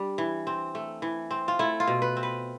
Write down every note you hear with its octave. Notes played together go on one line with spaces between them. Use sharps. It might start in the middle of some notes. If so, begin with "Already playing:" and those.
Already playing: G3 D4
E3
C4
A3
E3
C4
F4
A3 E4
F4
B2
B4
C4
B4